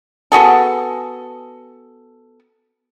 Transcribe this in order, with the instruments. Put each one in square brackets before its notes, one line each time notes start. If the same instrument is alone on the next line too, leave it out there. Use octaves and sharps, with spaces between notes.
[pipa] B3 F#4 G#4 A4